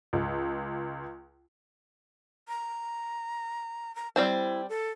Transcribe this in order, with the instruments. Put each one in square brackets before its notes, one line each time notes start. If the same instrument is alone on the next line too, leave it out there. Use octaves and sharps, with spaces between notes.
[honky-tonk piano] C#2
[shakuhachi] A#5
A#5
[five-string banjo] G3 C4 C5 [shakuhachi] E4
[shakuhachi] A4